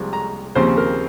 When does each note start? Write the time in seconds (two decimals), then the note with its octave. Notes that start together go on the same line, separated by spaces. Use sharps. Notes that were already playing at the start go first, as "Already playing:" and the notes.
Already playing: C2 C3 F3 G#3
0.13 A#5
0.55 D#2 C#3 F3 C4 C5
0.77 A#4